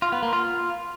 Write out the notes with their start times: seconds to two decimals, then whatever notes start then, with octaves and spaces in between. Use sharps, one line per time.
0.02 F4
0.12 B3
0.23 A#3
0.33 F4